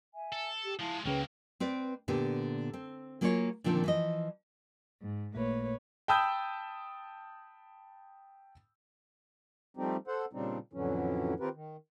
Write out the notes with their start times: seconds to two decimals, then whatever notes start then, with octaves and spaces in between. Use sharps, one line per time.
0.13 E5 G#5
0.32 A4
0.64 G4
0.79 F3 G#3 E4 F5 A5
1.05 C#2 C#3 F#3 A#3 B4 G5
1.60 C4 B4 D5
2.08 A#2 D3 B3 G4
2.74 C4
3.21 F#3 A#3 F4 G#4 C5 C#5
3.64 A#2 D3 D#3 F3 C4 D4
3.84 E3 F3 D#5
5.02 G#2
5.35 A1 A#2 A3 A#3 B4 C#5
6.08 G5 A5 B5 D#6 E6 G6
9.77 F3 G3 A3 C4 D#4 G4
10.08 A4 C5 F#5
10.33 A#2 C#3 G3 C4 D4 D#4
10.73 F2 A2 D3 E3 F#3 C#4
11.40 D#3 C4 F4 G4 A#4 B4
11.54 D#3